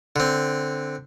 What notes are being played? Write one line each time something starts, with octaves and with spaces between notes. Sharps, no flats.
D3 C4